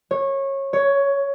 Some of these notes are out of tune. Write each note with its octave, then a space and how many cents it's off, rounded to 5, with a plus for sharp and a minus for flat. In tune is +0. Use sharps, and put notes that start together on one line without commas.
C#5 -20
C#5 +10